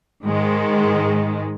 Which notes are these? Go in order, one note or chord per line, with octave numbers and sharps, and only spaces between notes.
G#2 D#3 G#3